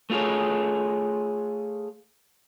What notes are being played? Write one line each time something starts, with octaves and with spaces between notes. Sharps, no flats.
A3 F4 G#4 C#5